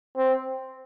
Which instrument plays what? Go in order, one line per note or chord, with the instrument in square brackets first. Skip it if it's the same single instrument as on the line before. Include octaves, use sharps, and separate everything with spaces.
[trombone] C4